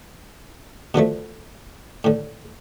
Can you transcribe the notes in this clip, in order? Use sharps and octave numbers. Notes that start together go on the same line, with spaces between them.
B2 D3 F3 A3
A2 D3